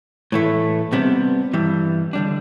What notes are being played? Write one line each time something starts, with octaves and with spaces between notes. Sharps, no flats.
A2 E3 A3
C3 G3 B3 D4
G2 E3 G3
D3 G3 D4